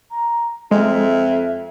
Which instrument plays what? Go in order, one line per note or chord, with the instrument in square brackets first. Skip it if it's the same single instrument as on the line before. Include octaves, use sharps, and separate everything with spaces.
[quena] A#5
[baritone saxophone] F2 [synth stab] G#3 [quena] E5